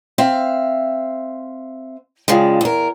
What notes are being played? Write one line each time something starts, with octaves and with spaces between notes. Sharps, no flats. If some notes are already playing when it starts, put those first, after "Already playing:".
C4 E5 F5
C#3 F3 G3 G#3
E2 A#4